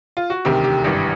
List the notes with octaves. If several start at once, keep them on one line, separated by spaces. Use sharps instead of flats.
F4
F#4
E1 D2 C3 D#3 G4
G4
G#1 G2 E3 G4